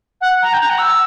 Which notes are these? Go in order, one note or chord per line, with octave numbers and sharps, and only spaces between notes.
F#5
A#5
G5
A#5
F#5
E6